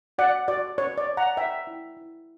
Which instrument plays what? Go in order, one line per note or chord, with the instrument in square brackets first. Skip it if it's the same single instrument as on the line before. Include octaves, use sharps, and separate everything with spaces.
[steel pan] F#4 D5 F#5
F#4 D5
B4 C#5
D5
B4
F#5 A#5
B4 E5 G5
E4
E4